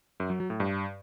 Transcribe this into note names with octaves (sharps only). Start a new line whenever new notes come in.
F#2
F#3
F#3
A2
G2